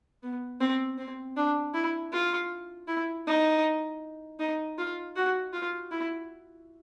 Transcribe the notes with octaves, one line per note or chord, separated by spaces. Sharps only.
B3
C4
C4
D4
E4
F4
E4
D#4
D#4
F4
F#4
F4
E4